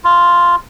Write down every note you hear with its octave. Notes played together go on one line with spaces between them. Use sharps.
F4